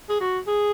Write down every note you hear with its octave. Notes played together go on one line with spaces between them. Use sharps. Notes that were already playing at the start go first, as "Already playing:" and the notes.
G#4
F#4
G#4